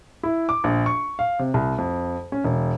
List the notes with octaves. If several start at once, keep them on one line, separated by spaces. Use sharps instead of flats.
E4
D6
A#1
C#6
F5
C3
C2
F2
C#4
E1